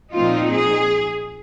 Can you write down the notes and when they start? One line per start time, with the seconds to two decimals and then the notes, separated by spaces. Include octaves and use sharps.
0.13 A#2 F3 C4 D#4 F4
0.51 G#4